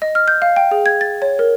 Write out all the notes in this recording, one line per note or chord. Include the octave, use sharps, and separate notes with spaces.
D#5
F6
G6
F5
G5
G#4
G#6
A6
C#5
A#4